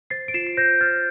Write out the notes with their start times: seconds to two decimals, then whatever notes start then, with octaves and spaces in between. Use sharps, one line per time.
0.10 C5 A6 C7
0.28 D7
0.34 F4 C7 E7
0.47 C7
0.57 C5 G6 A#6
0.80 C5 F6 A6